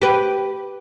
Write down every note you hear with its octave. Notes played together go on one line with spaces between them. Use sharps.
G4 B4